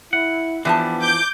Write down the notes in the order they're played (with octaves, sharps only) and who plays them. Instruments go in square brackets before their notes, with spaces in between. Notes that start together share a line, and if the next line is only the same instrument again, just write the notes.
[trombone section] E4 [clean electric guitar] F#5
[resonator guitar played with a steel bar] E3 F3 A5 [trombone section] B3 [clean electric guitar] D4 G4
[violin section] D6 G6